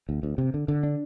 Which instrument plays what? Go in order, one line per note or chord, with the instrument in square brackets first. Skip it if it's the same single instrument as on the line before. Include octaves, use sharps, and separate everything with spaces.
[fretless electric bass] D2
D2
C3
D3
D3
D4